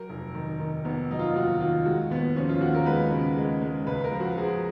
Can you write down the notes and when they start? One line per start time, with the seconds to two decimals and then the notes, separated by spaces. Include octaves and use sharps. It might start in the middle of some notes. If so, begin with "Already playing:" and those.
Already playing: F#3 A#4
0.10 F1
0.34 D#3
0.60 D#3
0.85 F1 B3
1.11 F#3 D#4
1.19 F4
1.35 D#2 F#4
1.60 D#3 F4
1.86 G#3 F#4
2.11 D#2 B3
2.36 F3 C#4
2.49 F4
2.61 D#2 F#4
2.74 A#4
2.86 G#3 B4
3.12 C#3
3.37 G#3
3.61 G#3
3.87 C#2 B4
4.04 A#4
4.12 F3
4.20 F#4
4.37 F3 G#4